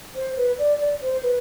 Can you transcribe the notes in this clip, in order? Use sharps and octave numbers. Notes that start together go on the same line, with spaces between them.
C5
B4
D5
D5
C5
B4